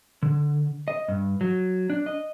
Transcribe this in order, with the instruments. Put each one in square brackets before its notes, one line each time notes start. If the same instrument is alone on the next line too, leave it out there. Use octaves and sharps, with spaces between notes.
[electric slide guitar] D3
D#5
G2
F#3
D4
D#5